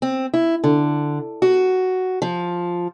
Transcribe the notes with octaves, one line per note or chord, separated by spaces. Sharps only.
C4
E4
D3
F#4
F3